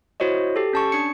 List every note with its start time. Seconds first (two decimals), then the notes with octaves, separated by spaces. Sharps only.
0.20 E4 F#4 C5 C#5 D#5
0.56 G4 A4
0.73 C#4 A5 C#6
0.92 D4 C#7